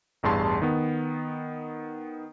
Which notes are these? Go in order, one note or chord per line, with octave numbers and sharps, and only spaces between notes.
A1 E2 G2 G#4 A5 C6
D#3 B3